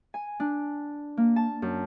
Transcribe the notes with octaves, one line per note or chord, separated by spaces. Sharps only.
G#5
D4
A#3
A5
F#2